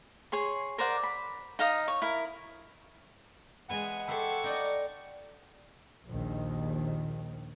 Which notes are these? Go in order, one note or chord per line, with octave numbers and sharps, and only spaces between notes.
G#4 C#5 C6
A#4 C5 D5 F#5
B5
D#4 D#5 F5 D#6
C#5
E4 A#4
E3 G#3 B3 F#5 G#5
E4 G4 A4 C5 C#6
D#4 D5 D#5
A#1 D#2 D#3